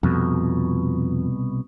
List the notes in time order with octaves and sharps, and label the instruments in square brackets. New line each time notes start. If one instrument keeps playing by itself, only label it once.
[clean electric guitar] C2 B2 [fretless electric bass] F2